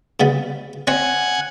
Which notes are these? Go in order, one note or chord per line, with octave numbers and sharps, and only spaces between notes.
C#3 G3 B3
C4 C#4 C#5 F#5 G#5